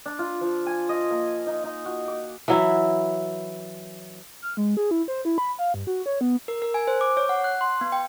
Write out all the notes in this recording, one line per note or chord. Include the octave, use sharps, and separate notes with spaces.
D4
F4
F3
G#5
D#5
A#3
D#4
D#4
F#4
D6
E3 F#3 E4
F6
G#3
G#4
E4
C5
E4
B5
F5
G2
F#4
C#5
B3
A#4
A#4
G#5
C5
D6
C#5
F#5
F#6
C6
B3
G5